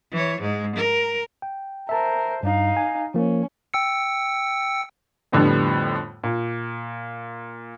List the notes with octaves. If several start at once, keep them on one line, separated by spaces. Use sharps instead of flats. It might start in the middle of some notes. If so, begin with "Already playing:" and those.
E3 C#5
G#2 G#3
A#4
G5
A#4 C5 E5 A5
G2 D#4 F5
G#5
F3 A#3 C#4
G5 E6 C#7
F2 A2 D3 F3 G3 B3
A#2